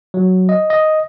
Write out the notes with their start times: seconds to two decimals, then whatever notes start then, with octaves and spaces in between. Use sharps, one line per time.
0.14 F#3
0.49 D#5
0.70 D#5